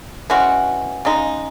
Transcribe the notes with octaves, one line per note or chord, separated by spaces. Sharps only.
E3 G#3 C#4 F#4
C#3 G#3 D#4